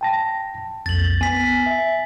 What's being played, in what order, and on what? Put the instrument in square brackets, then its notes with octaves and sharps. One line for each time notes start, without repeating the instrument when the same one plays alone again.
[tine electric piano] G5 A5 A#6
[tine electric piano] B1 F2 [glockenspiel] A6 F#7
[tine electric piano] B3 [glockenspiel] G#5 B6
[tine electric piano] E5